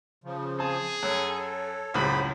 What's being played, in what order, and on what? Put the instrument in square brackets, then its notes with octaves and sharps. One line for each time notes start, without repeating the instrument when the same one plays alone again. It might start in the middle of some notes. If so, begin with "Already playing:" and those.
[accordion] C#3 F3
[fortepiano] C4 A5 [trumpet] G#4
[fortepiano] F#2 [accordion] A4 [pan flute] C#5
[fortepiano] C#2 F#2 A2 [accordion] G4 G#4 C5 [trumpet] B5